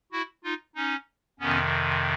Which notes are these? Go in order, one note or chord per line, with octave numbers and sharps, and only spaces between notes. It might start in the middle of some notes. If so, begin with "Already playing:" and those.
E4 F#4
D#4 F4
C#4 D#4
F2 C3 D#3 B3 C#4